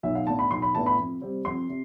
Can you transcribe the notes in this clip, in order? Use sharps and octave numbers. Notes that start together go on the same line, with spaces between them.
B1 E5
F5
A2 E3 B3 D4 A5
B5
B1 C6
B5
A2 E3 B3 D4 A5
B5
F2
C3 G3 C4
F2 C6
C3